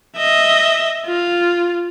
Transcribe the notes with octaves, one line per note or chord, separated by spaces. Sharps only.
D#5 E5
F4